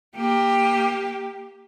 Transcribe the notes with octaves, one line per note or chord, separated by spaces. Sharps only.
A#3 G4